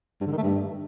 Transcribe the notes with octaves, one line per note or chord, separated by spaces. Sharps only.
G2
D3
D#3
A3
G2